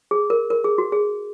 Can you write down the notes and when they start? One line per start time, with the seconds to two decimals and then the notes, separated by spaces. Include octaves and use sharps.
0.11 G#4
0.30 A#4
0.50 A#4
0.64 G#4
0.78 F#4
0.92 G#4